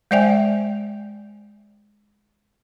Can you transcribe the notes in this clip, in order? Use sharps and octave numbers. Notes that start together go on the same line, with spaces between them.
G#3 C5 D5 E5 G5 G#5